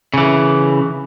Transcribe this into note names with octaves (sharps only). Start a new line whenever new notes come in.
C#3 E3